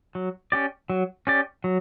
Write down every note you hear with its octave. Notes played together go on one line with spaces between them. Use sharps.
F#3
C#4 G4 D5
F#3
C#4 G4 D5
F#3